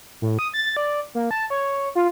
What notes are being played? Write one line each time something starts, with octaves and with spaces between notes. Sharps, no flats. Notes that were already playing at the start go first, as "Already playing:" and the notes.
A2
D#6
A6
D5
A#3
A5
C#5
F4